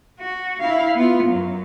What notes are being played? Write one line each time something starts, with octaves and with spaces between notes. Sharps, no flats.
F#4
E4 F5
B3 F4
F#2